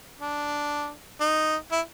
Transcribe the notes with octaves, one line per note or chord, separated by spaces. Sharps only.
D4
D#4
E4